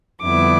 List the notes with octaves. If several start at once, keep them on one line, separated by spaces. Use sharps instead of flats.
F2 D3 G3 B3 E4 D6